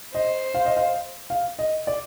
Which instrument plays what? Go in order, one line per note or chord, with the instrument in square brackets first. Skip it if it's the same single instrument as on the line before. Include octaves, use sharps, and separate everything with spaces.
[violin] C5 [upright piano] D#5
[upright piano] F5
D#5
F5
F5
D#5
D5